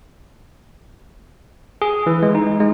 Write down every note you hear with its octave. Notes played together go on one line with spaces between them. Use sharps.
G#4
E3
G#3
D#4
G#3